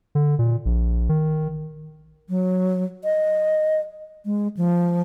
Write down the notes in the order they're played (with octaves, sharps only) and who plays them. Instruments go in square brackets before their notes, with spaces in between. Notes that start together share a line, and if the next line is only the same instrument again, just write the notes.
[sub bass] D3
A#2
A#1
D#3
[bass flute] F#3
D#5
G#3
F3